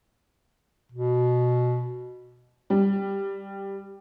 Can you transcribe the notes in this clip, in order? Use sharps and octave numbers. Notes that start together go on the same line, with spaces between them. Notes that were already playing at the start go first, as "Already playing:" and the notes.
B2
G3